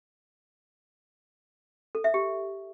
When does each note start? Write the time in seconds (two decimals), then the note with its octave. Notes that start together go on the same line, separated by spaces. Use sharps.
1.95 A4
2.04 E5
2.14 G4